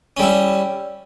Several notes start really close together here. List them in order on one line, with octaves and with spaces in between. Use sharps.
C#4 G3 E4